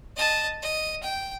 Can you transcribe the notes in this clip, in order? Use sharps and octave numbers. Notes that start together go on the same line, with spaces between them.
D#5 A5
D#5
G5